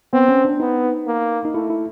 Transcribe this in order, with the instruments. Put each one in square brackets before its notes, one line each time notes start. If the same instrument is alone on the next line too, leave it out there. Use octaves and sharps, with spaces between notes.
[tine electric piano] B3 [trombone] C4
[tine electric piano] C#4
D4
[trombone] B3 [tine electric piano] D#4
[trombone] A#3
[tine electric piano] D#4
[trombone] A3 [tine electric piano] E4
[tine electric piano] E4